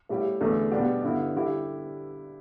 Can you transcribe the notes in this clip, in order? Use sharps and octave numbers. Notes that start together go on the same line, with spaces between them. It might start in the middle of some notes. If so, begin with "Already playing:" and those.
A2 G3 E4 G4
E2 D3 A3
B2 G3 B3 D4 G4
G2 D3 B3 E4
D3 G3 E4 G4